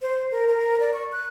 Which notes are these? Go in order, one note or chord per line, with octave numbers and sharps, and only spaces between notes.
C5
A#4
A#4
D5
C#6
F#6